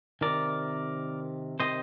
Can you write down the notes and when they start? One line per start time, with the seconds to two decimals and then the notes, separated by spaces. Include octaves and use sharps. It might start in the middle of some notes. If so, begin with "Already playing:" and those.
0.21 C3 D#3 A#4 D5
1.60 C3 D#3 C5 D#5